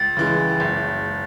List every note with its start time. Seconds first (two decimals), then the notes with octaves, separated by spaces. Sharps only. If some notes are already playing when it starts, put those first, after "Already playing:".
Already playing: C#2 A6
0.17 C#3 E3 G#3
0.60 F#1